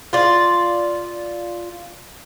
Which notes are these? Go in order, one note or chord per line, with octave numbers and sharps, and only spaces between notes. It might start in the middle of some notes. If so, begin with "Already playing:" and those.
F4 D5